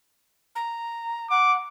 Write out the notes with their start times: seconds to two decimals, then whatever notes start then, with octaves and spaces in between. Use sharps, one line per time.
0.55 A#5
1.30 F#5 D6